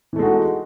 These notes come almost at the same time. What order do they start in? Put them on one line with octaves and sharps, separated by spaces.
E3 A3 G#3 F#4 D#4